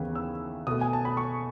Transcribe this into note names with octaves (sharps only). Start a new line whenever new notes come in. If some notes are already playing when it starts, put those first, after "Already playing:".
Already playing: D#2 C#3 E3 B3
E6
B2 A3 D#6
G#5
A5
B5
C#6